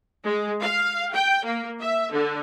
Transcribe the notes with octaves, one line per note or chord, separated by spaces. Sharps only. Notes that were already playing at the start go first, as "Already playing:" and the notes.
G#3
F5
G5
A#3
E5
D3